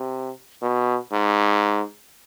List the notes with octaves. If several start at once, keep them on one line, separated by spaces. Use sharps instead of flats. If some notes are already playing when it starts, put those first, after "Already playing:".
Already playing: C3
B2
G#2